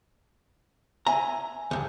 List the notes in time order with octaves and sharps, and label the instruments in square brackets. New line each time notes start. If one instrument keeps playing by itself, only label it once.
[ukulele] E5 G#5 [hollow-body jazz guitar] A#5
[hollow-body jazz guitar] D2 G2